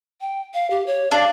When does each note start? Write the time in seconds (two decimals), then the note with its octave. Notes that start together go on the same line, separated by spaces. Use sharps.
0.21 G5
0.54 F5
0.70 G4
0.87 C#5
1.11 D4 F5